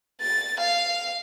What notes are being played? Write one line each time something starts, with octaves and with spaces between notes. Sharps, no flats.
A6
F5